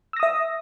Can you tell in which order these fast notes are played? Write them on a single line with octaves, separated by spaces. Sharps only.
E6 A#6 D#6 E5